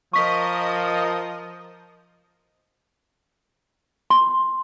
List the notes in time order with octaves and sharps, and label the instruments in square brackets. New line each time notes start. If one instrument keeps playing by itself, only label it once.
[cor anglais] F3 [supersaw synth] A#4 D#5 D#6 [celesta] C#6 B6
[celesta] C6